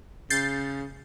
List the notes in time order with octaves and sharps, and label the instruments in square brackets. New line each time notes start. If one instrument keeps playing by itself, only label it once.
[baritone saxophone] C#3 [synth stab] G6 A6 C7